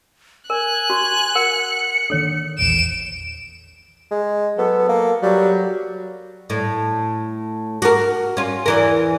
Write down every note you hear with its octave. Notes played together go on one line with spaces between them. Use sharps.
A#4 G#5 F#6
F#4 C#6
A#4 F#5 C#7
D#3 A#3 D4 A4 C#5
E1 A#1 E2 D7 E7
G#3
F#3 B3 A4
A#3
F#3 G3
A2
F#4 A#4
C#4 F4
E2 E3 A#4